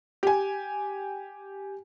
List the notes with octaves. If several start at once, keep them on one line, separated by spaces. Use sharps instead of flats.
G4 G#5